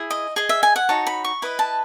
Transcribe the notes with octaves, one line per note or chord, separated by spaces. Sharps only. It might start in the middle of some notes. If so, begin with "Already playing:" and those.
Already playing: E4 G#4
D#5
G#4 D#5
E5
G#5
F#5
D#4 F#4 C#5 A5
B5
C#6
E4 B4 D#5 B5
A5